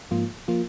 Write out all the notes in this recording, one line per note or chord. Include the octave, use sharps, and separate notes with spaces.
G#2 F3 A#3 F4
F3 A#3 F4